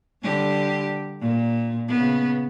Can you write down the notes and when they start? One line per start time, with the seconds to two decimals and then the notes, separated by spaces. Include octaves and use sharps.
0.23 D3 G3 G4
1.22 A#2
1.88 C#3 B3